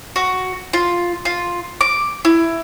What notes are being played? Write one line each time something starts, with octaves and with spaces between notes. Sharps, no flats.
F#4
F4
F4
D6
E4